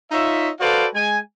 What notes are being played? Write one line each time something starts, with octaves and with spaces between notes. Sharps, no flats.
D#4 F4 C#5 E5
F#4 A4 B4 C5 D5 F5
G#3 G#5